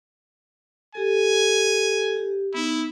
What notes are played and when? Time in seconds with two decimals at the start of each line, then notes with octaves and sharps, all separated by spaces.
0.95 G4 A4 G#5
2.17 G4
2.54 B3 D#4 E4